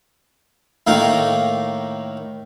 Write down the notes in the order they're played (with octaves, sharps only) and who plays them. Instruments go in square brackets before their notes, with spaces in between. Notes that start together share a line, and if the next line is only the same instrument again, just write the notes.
[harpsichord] A2 D#3 A#3 D#4